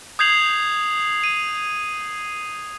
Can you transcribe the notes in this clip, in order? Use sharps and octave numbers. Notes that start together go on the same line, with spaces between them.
D#6 G6 G#6 C7 F7 F#7
D#7